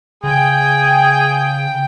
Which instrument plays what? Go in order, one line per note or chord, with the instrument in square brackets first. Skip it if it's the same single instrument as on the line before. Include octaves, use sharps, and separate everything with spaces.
[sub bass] C#3 [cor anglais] G#4 [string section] G5